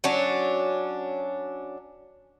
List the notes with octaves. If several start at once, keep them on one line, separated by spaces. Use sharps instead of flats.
F#3 C#4 D4